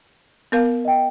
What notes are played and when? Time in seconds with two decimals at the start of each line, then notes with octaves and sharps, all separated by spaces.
0.52 B3 A#4 F5
0.85 D#5 G5